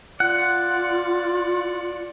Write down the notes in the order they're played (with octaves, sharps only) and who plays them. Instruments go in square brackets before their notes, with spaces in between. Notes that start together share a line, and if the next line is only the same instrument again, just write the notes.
[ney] F4 [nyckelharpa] D5 [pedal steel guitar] F#5